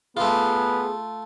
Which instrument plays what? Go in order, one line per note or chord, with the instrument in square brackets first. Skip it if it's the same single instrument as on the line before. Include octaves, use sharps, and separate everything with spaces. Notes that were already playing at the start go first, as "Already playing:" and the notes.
[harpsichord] A3 F4 [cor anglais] B3 [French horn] G#4